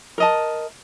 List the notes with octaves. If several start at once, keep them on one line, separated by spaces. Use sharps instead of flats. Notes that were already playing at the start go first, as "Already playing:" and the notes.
A#4 D#5 A5